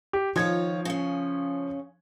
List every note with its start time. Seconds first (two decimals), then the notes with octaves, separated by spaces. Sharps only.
0.13 G4
0.36 D#3 F3 F4 C#5 G#6
0.85 C#3 C#4